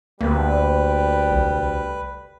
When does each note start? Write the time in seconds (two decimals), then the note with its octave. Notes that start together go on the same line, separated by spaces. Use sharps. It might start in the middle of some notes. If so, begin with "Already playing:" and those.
0.21 D2 G3 A#3 B4
1.32 C2